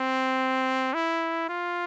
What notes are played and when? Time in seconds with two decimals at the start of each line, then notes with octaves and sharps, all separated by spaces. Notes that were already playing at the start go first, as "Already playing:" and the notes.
Already playing: C4
0.94 E4
1.49 F4